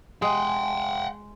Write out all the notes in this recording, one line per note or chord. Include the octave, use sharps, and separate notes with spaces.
G#3 F#5 G5